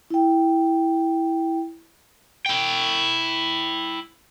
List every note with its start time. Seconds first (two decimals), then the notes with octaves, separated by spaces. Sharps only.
0.10 E4 G5
2.46 E4 G5